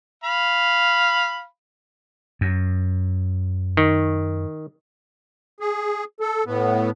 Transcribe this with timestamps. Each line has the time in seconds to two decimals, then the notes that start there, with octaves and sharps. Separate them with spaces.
0.24 F5 B5
2.41 F#2
3.77 D#3
5.60 G#4
6.20 A4
6.46 A2 B3